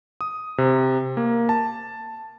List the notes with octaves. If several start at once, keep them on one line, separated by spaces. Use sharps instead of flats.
D#6
C3
A#3
A5